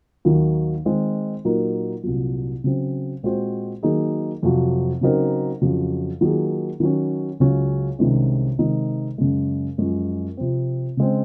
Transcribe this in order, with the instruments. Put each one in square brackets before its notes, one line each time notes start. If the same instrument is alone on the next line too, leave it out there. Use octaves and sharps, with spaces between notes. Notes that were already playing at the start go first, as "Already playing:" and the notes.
[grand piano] D#2 D#3 F#3 A#3
D#3 G#3 C4
A#2 F#3 A#3 D#4 A#4
C2 A#2 F#3
C#3 F#3 C4
A#2 G#3 C4 F#4 C5
D#3 F#3 A#3 D#4 G#4
F2 C3 F#3
C#3 F#3 C4 D#4 A#4
F2 C#3 F#3
D#3 F#3 A#3 F4 G#4
D#3 F#3 C#4
C#2 C#3 F#3 C#4
C2 C3 D#3 G#3 C#4
C3 D#3 G#3 D#4
F#2 C#3 G#3
F#2 F3 G#3
C3 F3 C4
C#3 G#3 C4